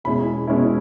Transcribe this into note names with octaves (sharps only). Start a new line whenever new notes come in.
E2 B2 G#3 C#4 E4 B5
E2 B2 G#3 C#4 E4